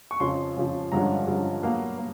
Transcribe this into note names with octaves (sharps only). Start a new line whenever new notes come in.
C#6
F2 C#3 F3 C6
F2 C#3 F3
G2 D3 F3 G#3 C#4 A#5
G2 D3 F3 G#3 C#4
B2 F#3 A#3 F5
A#3